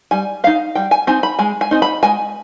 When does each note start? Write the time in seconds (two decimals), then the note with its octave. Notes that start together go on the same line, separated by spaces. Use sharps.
0.11 G3 G#5
0.44 C4 D#4 F5
0.75 G3 G5
0.91 G#5
1.07 C4 D#4 G#5
1.23 B5
1.39 G#3 G#5
1.61 G#5
1.71 C4 D#4
1.82 B5
2.03 G#3 G#5